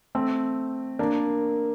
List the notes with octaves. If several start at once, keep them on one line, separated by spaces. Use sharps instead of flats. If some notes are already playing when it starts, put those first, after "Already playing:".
A3 C4
A#3 D4